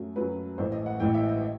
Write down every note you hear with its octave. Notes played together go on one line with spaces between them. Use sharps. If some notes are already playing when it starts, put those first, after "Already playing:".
Already playing: F#2 F#3 A3
F#2 F#3 A3 B4
A1 A2 E3 A3 C5
D#5
F#5
A1 A2 E3 A3 G5
E5
D#5